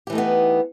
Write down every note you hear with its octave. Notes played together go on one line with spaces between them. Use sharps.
E3 A3 B3 D#4 G4